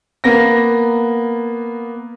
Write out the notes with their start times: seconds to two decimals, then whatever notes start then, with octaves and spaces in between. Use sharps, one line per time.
0.24 A#3 B3 A#6